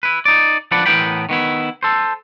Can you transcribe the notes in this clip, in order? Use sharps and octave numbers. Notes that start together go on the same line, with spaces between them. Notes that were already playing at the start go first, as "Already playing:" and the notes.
E4 B4
D#4 D5
F3 D4 B4 D5 F#5
A2 E3 B3 A#4 G5 B5
D#3 B3 E4
A4 C5